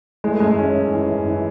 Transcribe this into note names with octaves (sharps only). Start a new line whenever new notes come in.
E3 G#3
A3
F#2 G#3
E3 C#4
F#2
E3
F#2
E3